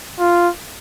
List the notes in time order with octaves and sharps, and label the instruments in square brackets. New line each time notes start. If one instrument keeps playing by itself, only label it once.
[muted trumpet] F4